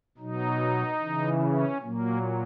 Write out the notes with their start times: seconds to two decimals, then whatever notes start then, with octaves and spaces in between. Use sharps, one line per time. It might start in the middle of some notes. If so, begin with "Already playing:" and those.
0.18 B2 F#3 D#4
1.00 C#3 E3
1.41 C#4
1.81 A#2 F#3 A#3